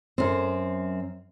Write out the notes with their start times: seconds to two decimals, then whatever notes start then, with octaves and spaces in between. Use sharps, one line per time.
0.18 F#2 C4